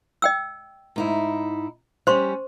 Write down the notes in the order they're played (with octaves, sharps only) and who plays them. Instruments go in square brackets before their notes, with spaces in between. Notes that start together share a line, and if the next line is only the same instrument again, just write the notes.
[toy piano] D#5 G5 E6
[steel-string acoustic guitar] G#2 D#4 E4
[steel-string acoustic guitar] G3 C#4 [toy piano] C5 C6 C#6